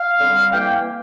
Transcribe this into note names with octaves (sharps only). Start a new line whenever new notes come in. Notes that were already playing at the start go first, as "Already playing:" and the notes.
Already playing: F5
D3 G3 C4
E3 A#3 G5